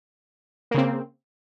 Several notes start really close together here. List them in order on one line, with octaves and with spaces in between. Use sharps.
A#3 C#3 C4